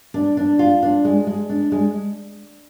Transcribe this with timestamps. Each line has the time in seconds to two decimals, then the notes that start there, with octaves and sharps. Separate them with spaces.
0.14 D4
0.37 D4
0.59 F4
0.83 D4
1.05 G#3
1.27 G#3
1.49 D4
1.72 G#3